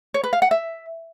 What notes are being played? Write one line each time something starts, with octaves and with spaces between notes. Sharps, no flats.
C#5
B4
F5
F#5
E5